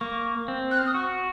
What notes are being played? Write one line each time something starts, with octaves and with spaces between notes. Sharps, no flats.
A#3 C#6
C4
F#6
F6
D#6
F#4 C#6